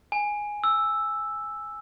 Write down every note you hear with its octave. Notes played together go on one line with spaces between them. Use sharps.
G#5
E6